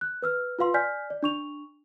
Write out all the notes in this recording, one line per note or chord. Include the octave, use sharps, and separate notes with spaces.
F#6
B4 E6 F6
F4 B4 F5 C6
D5 G#5 F6 G6 B6
D5
D4 C#6 F7